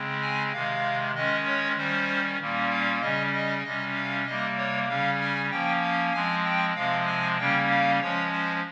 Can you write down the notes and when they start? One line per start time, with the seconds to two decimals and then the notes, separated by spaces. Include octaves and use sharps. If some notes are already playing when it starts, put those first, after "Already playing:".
Already playing: C#3 G#3 C4
0.21 G#5
0.52 C3 D#3 G#3 F5
1.15 D#3 G#3 C#4 D#5
1.46 C#5
1.77 D#3 G3 C#4 C5
2.40 A#2 G3 A#3 C#4
2.71 F5
3.01 C#3 G3 C#4 D#5
3.33 D#5
3.63 C3 G3 C#4 D#5
3.95 F5
4.26 C3 G3 A#3 D#5
4.57 C#5
4.88 C#3 G3 C#4 F5
5.20 G#5
5.51 F3 A#3 C#4 G5
5.82 F5
6.14 F3 G#3 C4 G#5
6.44 G5
6.75 C3 F3 G#3 C4 F5
7.06 G#5
7.38 C#3 G3 A#3 C#4 G5
7.70 F5
8.00 F3 G#3 C#4 C#5
8.31 C5